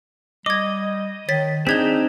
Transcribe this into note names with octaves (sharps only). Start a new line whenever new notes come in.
G3 D#5 D6 G#6
D#3 C#5 A6 B6
C4 D4 D#4 G#4 G6 G#6 B6